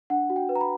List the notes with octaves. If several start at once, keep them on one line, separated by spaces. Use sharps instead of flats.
D4 F#5
F#4
G5
B4
A#5
B5